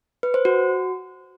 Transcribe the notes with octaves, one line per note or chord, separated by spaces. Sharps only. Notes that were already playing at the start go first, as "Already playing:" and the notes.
B4
C5
F#4